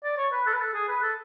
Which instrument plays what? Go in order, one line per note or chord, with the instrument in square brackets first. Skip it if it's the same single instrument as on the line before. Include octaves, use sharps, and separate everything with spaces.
[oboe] D5
C#5
B4
A4
B4
A4
G#4
B4
A4